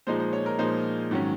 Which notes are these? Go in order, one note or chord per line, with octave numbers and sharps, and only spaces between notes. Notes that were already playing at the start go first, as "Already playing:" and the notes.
A#2 F3 G#3 D#4 C5
C5
C#5
A#4
A#2 F3 G#3 D#4 C5
G#2 D#3 F#3 C#4